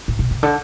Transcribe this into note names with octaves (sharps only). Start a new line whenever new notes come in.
A2
B2
C3
D3